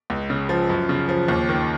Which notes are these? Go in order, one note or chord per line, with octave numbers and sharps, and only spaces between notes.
C#2
C#3
F3
F#2
C#3
F3
D#2
D#3